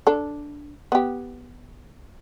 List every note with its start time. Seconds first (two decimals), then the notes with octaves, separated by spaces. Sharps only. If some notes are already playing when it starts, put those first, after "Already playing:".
0.07 D4 A4
0.92 B3 G4